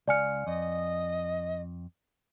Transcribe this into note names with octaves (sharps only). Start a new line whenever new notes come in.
C#2 D5 F5 G#5 C#7
F2 D#5